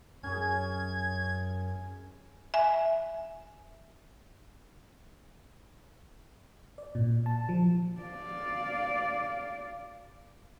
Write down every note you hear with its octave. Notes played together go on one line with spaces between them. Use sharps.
F#2 C#4 G#4 G#6
E5 G#5
D5
A#2
A5
F3
D5 F5